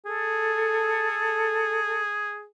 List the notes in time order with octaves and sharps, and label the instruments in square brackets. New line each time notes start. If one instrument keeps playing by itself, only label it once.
[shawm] G#4 [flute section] A4